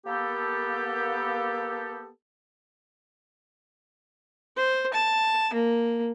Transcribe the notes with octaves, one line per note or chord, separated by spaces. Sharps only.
A#3 B3 G4 A4
C5
A5
A#3